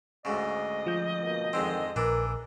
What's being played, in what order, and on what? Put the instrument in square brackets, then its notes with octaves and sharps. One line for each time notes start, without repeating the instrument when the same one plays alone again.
[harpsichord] D2 G#2 C#3 [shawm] D#5
[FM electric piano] F3 G6
[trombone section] B2 A#3
[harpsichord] F2 G#3 C4 [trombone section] G#2 D3 D#3
[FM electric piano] A#1 [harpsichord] E3 D4 [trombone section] A#4